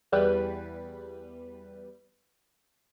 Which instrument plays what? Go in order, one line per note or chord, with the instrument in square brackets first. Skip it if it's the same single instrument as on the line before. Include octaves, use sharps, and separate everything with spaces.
[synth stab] E2 G3 B4